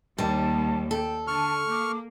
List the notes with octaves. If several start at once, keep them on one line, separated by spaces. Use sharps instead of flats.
D#2 G3 A5
A4 G5
D3 A5 C#6 F6
A#3 D6